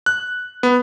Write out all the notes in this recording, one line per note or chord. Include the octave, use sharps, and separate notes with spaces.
F#6
B3